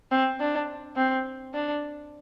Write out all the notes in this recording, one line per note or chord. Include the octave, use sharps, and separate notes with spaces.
C4
D4
C4
D4